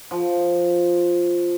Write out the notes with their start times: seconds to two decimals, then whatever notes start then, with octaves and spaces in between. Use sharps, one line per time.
0.11 F3